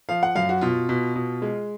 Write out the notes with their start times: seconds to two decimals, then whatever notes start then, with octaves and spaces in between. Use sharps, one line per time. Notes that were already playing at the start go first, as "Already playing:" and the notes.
0.09 F3 F5
0.23 F#5
0.36 F#2 F5
0.49 F#4
0.61 B2 F4
0.89 B2
1.16 B2
1.42 G#3